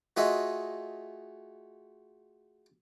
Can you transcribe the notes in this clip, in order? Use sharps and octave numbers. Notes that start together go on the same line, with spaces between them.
A3 F4 F#4 G#4 D#5 E5